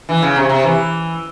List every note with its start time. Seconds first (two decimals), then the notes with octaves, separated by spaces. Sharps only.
0.09 E3
0.22 C#3
0.36 C3
0.49 C3
0.63 E3